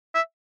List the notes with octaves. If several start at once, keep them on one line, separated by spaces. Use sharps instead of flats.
E5